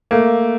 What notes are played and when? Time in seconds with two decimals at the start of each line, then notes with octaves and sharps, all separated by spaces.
0.11 A3 A#3